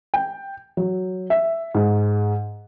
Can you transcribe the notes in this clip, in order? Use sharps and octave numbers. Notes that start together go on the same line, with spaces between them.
G5
F#3
E5
G#2